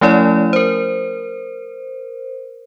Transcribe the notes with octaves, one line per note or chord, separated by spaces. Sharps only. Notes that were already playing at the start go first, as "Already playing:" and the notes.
F3 A3 C#4 E4 C#5 D5
A#4 C5